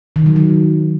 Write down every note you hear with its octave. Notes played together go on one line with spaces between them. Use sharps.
D#3
F#3
F#3